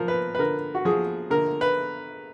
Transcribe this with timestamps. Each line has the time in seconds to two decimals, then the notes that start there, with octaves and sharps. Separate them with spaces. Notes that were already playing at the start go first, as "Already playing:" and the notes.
Already playing: F3 A#4
0.08 B4
0.35 B4
0.39 D3 A#4
0.75 F#4
0.85 F3 G#4
1.30 D3 A#4
1.61 B4